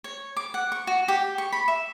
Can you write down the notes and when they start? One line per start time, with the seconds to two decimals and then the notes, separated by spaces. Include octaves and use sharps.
0.04 C#5
0.37 D6
0.54 F#5
0.72 C#6
0.87 F#4
1.08 G4
1.38 C#6
1.52 B5
1.68 E5